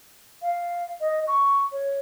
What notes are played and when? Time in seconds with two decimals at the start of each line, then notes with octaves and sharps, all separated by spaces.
0.42 F5
1.01 D#5
1.27 C#6
1.72 C#5